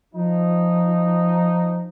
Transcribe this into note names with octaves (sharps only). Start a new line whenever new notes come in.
F3 D#4